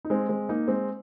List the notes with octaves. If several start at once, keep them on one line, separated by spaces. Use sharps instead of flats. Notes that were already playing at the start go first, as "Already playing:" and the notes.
D#4
G#3 C4
G#3 C4
A#3 D#4
G#3 C4